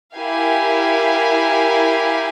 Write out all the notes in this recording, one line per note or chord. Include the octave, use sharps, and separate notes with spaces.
E4 G4 A#4 F5 G#5